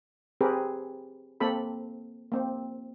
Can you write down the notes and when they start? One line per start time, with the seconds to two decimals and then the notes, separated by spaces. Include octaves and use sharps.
0.41 C4 G4 G#4 A#4 B4
1.40 A#3 C4 A4 B5
2.32 A#3 C4